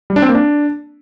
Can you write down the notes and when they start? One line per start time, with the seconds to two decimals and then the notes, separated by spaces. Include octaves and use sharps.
0.10 G3
0.16 D4
0.22 C4
0.29 A#3
0.35 D4